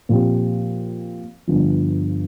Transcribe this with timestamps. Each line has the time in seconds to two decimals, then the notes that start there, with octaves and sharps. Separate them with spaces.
0.09 A#2 F3 C4 G4
1.47 G1 G2 F3